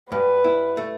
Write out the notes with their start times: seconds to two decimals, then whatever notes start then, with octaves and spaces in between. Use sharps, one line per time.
0.11 G2 B4
0.44 E4
0.77 A3